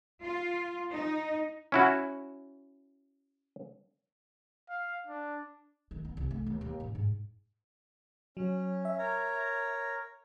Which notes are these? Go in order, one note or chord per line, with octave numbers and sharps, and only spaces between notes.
F4
D#4
C#4 E4 F#4
F5
D4
D#3
B3
C2
A3
D#2
D#2
A1
G#2
F#3 C#4
E5
A#4 C#5 A#5